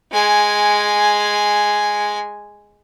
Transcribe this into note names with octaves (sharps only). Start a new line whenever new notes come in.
G#3 G#5